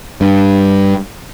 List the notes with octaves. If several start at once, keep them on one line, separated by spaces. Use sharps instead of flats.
G2